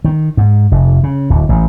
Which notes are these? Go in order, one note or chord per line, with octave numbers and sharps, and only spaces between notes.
D#3
G#2
F1
C#3
D1
A1